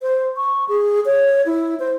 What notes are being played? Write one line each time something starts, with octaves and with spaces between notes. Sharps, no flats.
C5
C#6
G#4
C#5
E4
C5